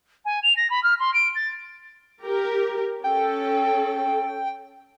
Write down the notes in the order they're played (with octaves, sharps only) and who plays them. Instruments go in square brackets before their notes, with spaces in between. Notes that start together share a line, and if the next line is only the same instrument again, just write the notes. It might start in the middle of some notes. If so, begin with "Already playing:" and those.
[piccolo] G#5
F7
A#6
B5
F6
C6
D7
A6
[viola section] G4 A#4
[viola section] C#4 A4 [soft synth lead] G5